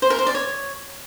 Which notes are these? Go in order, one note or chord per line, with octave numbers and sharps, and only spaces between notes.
C5
A#4
C5
D5
C#5